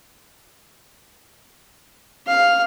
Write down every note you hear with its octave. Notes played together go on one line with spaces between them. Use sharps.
F5